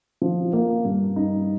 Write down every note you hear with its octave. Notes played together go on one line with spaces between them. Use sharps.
F3
A#3
G2
D#4